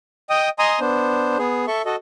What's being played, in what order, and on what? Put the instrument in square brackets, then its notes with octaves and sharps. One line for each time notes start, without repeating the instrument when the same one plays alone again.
[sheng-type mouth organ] D#5 G5 D#6
D#5 G#5 A#5 C6 D#6
B3 D4 C5
B3 G#4
A4 E5 C#6
F#4 A4 D#5